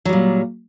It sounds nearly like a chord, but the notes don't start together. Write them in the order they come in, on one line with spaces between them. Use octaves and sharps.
F#3 G3 A#2